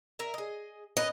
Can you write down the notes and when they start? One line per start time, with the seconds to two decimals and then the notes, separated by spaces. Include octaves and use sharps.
0.19 A#4 E5
0.34 G#4 D#5
0.97 C#4 A#4 B4 D#5